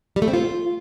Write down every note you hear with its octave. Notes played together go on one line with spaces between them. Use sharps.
G3
A3
C4
F4